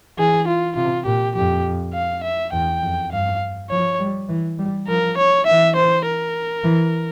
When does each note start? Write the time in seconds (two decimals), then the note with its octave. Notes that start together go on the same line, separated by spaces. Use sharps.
0.18 E3 G#4
0.48 F4
0.76 C3 F4
1.06 A#2 G4
1.35 F2 G4
1.94 F5
2.24 E5
2.53 E2 G5
2.82 F2
3.12 G2 F5
3.70 F3 C#5
4.00 G3
4.29 E3
4.59 G3
4.88 F3 A#4
5.18 C#5
5.47 E3 E5
5.77 C5
6.06 A#4
6.64 E3